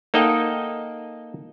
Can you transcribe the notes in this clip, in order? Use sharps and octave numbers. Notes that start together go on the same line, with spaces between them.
A#3 D#4 A4 D#5 F#5 G5